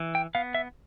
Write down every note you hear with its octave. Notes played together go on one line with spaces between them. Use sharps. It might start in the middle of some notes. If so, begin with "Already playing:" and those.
Already playing: E3
G5
B3 F5
E5